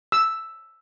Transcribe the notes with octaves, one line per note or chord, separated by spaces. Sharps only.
E6